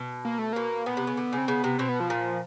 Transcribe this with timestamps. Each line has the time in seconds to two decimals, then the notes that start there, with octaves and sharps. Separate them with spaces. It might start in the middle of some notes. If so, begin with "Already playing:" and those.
Already playing: B2
0.25 A#3
0.39 A3
0.53 B2 A#3
0.86 A#2 B3
0.97 C3
1.07 C#3
1.17 D3
1.33 C#3
1.38 C4
1.48 C#3 B3
1.64 C3
1.78 B2 C4
1.89 B3
2.00 F3
2.10 A#2